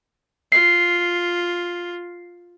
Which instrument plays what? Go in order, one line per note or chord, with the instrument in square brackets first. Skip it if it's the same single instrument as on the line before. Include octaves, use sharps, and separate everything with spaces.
[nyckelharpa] F4 [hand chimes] C7